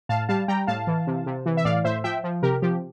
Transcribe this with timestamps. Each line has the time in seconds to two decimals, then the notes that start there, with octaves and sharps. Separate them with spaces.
0.09 A2 F5 A5
0.29 G3 F5 A5
0.48 G3 G5 A#5
0.67 A2 F5 A5
0.87 E3
1.07 C3
1.26 C3
1.46 E3
1.57 E5
1.65 A2 D5 F5
1.84 A2 C5 E5
2.04 F3 E5 G5
2.24 F3
2.43 C3 G4 A#4
2.62 F3 G4